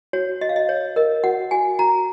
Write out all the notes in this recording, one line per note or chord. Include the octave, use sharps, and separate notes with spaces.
F#4 C#5
F#4 D#5
F5
D#5
C#5
A#4 D#5
F#4 F#5
F#4 G#5
F#4 A#5